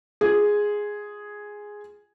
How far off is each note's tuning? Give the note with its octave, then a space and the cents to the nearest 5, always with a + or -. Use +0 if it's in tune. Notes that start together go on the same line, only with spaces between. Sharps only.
F4 +0 G#4 +0